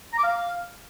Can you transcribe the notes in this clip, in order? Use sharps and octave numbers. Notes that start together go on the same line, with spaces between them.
A#5
D6
F5